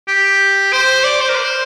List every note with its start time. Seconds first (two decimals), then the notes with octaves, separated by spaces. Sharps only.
0.08 G4
0.72 C5
1.04 D5
1.21 C5
1.29 A#4
1.36 C5